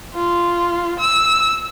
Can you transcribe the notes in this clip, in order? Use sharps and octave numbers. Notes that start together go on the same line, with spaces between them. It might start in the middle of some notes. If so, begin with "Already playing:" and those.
F4
E6